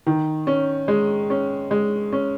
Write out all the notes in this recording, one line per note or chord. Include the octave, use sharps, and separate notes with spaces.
D#3
C#4
G#3
C#4
G#3
C#4